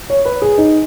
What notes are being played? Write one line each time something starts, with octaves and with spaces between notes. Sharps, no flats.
C#5
B4
G#4
D#4